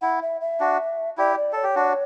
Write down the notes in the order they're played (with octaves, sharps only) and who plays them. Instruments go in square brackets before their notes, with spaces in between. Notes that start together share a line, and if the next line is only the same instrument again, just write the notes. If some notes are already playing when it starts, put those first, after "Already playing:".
[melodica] E4 [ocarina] F#5
[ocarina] E5
E5
[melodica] D4 F#4
[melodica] E4 G4 [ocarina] D5
[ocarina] D5
[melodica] A4 [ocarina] C#5
[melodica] G4
D4 F#4